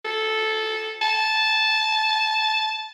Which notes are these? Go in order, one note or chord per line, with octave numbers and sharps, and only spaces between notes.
A4
A5